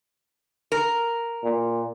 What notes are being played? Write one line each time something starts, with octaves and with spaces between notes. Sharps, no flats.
A#4
A#2